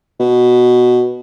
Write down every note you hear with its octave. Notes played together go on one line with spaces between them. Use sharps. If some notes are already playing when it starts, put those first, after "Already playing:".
B2